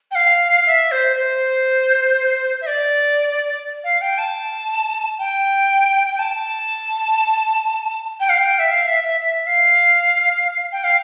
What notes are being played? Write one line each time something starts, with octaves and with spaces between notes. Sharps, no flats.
G5
F5
E5
C5
C5
E5
D5
F5
G5
A5
G5
G5
A5
G5
F5
G5
E5
F5
E5
E5
E5
F5
G5
F5